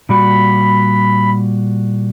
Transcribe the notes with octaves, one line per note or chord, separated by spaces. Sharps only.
A#2 G3 F#4 B5